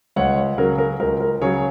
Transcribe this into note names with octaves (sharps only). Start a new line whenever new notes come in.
C#2 C#5 F#5
C#3 F#3 A#4
A#4
C#2 A#4
A#4
C#3 F#3 G#4 C#5